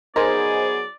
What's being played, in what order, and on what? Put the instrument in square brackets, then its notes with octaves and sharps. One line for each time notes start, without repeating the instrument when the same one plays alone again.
[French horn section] F#3 B3 G#4 [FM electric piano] D#4 C5 G#5 [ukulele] A#4 [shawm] D5